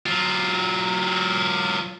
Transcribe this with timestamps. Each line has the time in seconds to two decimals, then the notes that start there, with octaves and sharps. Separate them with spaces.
0.06 F#3 F4